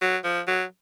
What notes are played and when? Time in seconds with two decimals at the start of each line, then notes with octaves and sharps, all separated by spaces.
0.01 F#3
0.24 F3
0.48 F#3